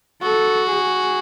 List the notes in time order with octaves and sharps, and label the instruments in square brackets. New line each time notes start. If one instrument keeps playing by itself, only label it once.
[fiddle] F#4 [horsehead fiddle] A4
[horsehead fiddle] G#4